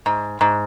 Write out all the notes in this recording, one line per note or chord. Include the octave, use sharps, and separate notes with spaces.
G#2
G#2